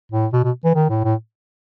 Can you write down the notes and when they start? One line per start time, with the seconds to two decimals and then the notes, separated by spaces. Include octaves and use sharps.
0.12 A2
0.33 B2
0.44 B2
0.65 E3
0.75 D#3
0.90 A2
1.04 A2